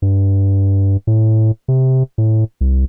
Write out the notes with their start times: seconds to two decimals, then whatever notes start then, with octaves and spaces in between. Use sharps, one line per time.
0.02 G2
1.07 A2
1.68 C3
2.18 A2
2.61 C2